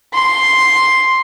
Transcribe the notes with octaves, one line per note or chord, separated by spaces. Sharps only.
C6